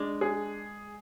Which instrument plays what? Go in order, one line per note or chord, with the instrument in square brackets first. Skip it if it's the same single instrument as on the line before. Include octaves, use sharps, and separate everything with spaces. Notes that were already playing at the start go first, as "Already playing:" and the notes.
Already playing: [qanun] G#3 [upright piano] D4
[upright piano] G#4